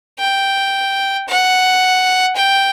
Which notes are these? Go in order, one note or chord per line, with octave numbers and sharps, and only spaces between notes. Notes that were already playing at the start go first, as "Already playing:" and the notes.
G5
F#5
G5